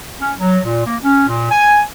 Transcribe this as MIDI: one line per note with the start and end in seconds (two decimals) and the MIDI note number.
0.20 0.32 61
0.40 0.60 54
0.65 0.82 46
0.86 0.96 58
1.03 1.27 61
1.27 1.49 46
1.51 1.80 80